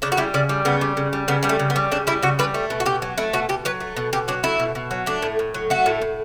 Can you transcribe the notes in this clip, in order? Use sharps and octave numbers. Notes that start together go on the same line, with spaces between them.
C#3 D4
F#4
G3 E4
C#3 D4
G3
C#3 B3
G3
C#3
G3
C#3 B3
G3 B3
A3
C#3
B3
G3
C#3 D4
G3 E4
C#3 F#4
G3 B4
A3
B2
F#4
B2 G4
F#3
A3 E4
B2 F#4
B2 G4
F#3 B4
A3
B2
B2 G4
F#3 D4
A3 E4
B2
B2
F#3
A3 D4
A2
A2
F#3
A3 F#4
A2
A2